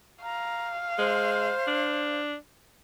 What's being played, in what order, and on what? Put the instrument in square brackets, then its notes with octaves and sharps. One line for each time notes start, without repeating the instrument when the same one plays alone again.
[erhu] F5 [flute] A#5
[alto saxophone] G#3 [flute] C5
[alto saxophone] D4